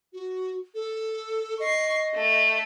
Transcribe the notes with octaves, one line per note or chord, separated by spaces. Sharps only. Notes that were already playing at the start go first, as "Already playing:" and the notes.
F#4
A4
D#5 C#6 C7
A3